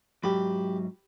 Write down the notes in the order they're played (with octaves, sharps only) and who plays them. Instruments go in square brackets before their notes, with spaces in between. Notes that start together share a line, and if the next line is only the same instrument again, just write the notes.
[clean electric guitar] G#2 F#3 [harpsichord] G4 B5